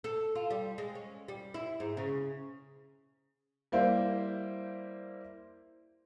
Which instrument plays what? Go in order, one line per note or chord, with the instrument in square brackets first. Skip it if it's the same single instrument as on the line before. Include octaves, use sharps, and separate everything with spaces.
[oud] A4
F4
G3
G#3
C#4
G3
E4
G#2
C#3
[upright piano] G3 A#3 E4 C5